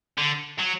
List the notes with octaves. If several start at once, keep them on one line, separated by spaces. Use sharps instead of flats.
D3
F#3